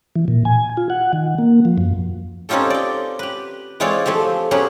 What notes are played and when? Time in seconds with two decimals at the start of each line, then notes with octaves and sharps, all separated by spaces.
0.16 E3
0.28 A#2
0.45 G#5
0.77 F4
0.90 F#5
1.13 D#3
1.38 A#3
1.65 F3
1.78 F#2
2.49 C4 C#4 D#4 F4 G4 A4
2.70 D5 G5
3.19 G4 B4
3.80 E3 G#3 C4 F4 C#5 D5
4.06 F3 A3 C4 G4
4.51 F#3 B3 C#4 G4 G#4